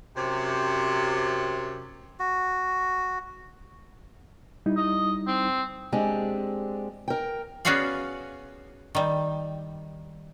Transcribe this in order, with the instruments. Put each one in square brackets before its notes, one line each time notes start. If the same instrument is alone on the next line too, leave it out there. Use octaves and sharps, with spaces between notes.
[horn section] F#2 C3
[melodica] F#4
[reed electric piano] G3 D#4 E4
[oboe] D#5
C4
[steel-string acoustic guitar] G#3 C4 D4 G4
A#4 G5
[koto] B3 C#4 F#4 G#4 D5 F5
D#3 G3